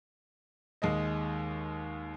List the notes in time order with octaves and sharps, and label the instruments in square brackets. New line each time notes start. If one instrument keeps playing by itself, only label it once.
[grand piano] D#2 G#3 D#5